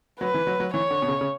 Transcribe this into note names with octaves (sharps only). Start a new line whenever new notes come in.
F#3 B4
E3
F#3
F#3
E3 C#5
D3
B2
C#3
C#3